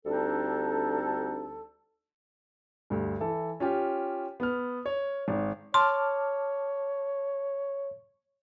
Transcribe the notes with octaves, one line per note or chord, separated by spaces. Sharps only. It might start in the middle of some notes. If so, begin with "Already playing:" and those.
D2 G3 C4 D4 D#4 A4
D2 G2
E3 A4
C#4 F4 G4
B3 F6
C#5
G#1
C#5 A5 C6 D6 F6